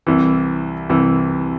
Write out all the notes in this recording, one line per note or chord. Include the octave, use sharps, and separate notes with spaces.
C2 C3 E3
C2 C3 E3